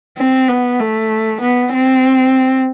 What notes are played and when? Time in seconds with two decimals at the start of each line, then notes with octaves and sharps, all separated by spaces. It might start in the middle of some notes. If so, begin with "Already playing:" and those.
0.18 C4
0.48 B3
0.79 A3
1.41 B3
1.73 C4